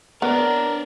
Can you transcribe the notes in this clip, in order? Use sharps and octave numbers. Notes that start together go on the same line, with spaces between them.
B3 D4 A#4 C#5 D5